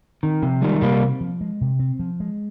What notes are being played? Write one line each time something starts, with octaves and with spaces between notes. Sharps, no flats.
D#3 C4
C3 F3
D#3 G3 G#3
C3 G3 A#3
C4
F3
G#3
C3
C4
F3
G#3